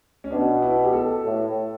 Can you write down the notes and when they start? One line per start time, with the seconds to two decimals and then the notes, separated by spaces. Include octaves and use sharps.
0.24 C#4
0.31 B2 D4
0.62 E4
0.84 G4
0.93 A4
1.25 A2